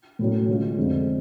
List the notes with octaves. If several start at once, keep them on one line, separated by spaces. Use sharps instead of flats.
A2 F#3 C#4
D3 G#3 C#4 F4
F2 D3 G#3